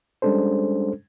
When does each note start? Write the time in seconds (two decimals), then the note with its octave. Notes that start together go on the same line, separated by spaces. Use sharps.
0.22 G3 G#3 C#4 D4 A4 C5